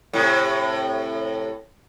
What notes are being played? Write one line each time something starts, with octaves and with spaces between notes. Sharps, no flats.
A2 C3